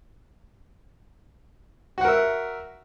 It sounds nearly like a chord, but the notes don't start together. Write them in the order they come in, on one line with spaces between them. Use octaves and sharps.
F#4 F#5 A#4 E5